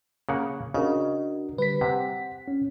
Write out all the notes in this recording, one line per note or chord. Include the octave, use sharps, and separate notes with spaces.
C#3 A#3 F#5
C#3 D4 F#4 A#4 D#5
D3 G3 B4 B6
C3 F#5 B6
C#4